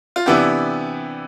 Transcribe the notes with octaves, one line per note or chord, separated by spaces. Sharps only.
F4
C3 E3 B3 D4 E4 G4